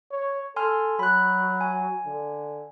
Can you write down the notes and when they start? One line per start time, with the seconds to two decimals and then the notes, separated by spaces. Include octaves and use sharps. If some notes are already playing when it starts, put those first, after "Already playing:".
0.11 C#5
0.56 A4 G#5 C6 F6
0.99 F#3 B5 F#6
1.61 G#5
2.06 D3